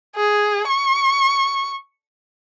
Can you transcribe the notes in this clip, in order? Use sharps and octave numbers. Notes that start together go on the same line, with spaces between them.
G#4
C#6